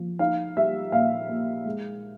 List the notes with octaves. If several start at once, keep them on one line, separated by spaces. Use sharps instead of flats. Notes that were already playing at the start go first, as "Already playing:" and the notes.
Already playing: F3
D#4 F5
G3 E5
A#2 F5
A#3
G#3